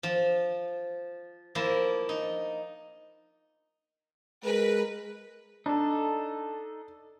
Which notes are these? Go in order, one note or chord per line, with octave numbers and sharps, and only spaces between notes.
F3
F3 A#3 E4
D#4
G#3 A#4 B4
D4 D#4 A4